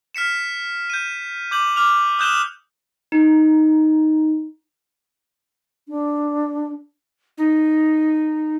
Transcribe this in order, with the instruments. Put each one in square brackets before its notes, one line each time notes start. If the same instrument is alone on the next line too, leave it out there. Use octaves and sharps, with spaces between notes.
[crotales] F6 B6 C#7 E7
G6 D#7
D6 G6 F#7
D6 F6 F7
D#6 F#6 G6 E7 G7
[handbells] D#4
[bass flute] D4
[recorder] D#4